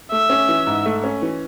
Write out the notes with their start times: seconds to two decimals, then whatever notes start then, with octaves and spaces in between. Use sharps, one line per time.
0.11 A3 E5
0.30 C#4
0.49 E3
0.67 G#2
0.86 A3
1.04 C#4
1.22 E3